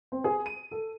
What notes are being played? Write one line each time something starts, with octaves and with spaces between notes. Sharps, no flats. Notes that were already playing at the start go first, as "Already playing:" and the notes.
C4
G#4
D#7
A4